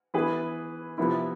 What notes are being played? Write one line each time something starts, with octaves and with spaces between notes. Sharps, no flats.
E3 B3 E4 G#4 B4
C3 F3 B3 E4